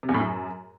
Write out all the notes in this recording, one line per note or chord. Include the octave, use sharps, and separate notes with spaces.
C3
E2
A2
F#2